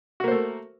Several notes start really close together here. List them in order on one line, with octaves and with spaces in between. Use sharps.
F#4 A#3 C5 A3